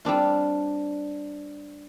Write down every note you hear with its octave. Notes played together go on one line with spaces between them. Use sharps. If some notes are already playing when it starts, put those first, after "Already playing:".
G3 C4 D4 F4